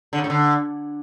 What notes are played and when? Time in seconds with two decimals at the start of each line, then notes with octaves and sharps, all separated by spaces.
0.13 D3
0.18 C#3
0.24 A2
0.30 D3